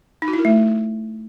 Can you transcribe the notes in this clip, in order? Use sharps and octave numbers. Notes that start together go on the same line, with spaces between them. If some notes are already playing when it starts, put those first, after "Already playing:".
D#4
F#4
E4
A#4
A3